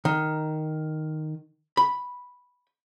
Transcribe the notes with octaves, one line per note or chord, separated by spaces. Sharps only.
D#3
B5